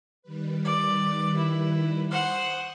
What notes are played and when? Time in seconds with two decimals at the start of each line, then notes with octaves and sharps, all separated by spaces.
0.22 D#3 G3 B4
0.65 D5
1.37 E4
2.11 C5 F#5 C#6 D#6 F#6